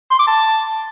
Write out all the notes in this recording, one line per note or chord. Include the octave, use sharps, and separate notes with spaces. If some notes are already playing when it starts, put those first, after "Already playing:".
C6
D6
A5